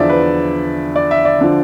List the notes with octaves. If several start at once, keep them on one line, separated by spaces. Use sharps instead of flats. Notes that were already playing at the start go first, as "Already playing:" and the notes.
Already playing: E2 D3 F3 D5 E5
B4
D5
E5
D5
D3 F3